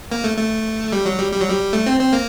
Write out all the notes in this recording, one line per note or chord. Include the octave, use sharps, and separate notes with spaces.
A#3
A3
A3
G3
F#3
G3
G3
F#3
G3
A3
C4
C4
A#3